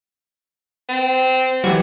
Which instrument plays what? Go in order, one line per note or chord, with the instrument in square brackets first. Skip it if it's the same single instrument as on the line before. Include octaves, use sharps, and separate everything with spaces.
[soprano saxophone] C4
[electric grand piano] E3 F#3 G3 [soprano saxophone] F#4